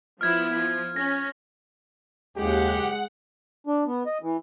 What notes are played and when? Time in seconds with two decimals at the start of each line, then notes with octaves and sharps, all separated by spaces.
0.21 F3 B3 E4 F6 G#6
0.53 F3
0.96 C#4 A#6
2.37 F#1 D#2 G#3 G4 F#5
3.67 D4
3.86 B3
4.06 D#5
4.23 E3